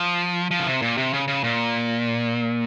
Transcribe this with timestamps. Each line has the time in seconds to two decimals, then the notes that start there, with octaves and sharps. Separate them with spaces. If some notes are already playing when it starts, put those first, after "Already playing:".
Already playing: F3
0.51 F3
0.60 C#3
0.66 C3
0.82 A#2
0.98 C3
1.13 C#3
1.28 C#3
1.44 A#2